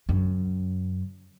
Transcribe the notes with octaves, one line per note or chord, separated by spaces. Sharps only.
F#2 C#3